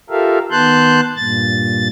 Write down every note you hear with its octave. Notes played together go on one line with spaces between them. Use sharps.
F4 G4 A4 A#4 E5 F5
D#3 B3 A5 C6 F#6 G6
G2 A#2 A6